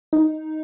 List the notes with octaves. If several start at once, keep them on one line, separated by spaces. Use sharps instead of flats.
D#4